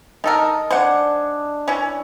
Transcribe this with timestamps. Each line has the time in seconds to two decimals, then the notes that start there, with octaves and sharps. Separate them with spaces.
0.24 D#3 A4 A#4 D#5
0.71 D4 C5 F#5 G#5
1.68 E3 C#4